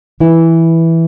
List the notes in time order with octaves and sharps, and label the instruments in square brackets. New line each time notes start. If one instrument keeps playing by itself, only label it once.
[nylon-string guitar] E3 E4